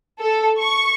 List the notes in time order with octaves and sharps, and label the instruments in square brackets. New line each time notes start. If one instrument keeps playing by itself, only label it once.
[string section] A4
C#6